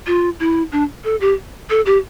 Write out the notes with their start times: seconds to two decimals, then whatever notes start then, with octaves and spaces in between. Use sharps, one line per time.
0.07 F4
0.40 E4
0.72 D4
1.04 A4
1.21 G4
1.70 A4
1.86 G4